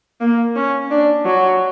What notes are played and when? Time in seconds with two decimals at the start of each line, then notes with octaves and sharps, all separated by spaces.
0.21 A#3
0.56 C#4
0.91 D4
1.25 F#3